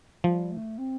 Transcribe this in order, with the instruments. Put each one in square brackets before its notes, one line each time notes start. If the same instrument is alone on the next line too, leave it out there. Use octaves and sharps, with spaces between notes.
[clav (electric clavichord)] F3 [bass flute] G3
[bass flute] A3
C4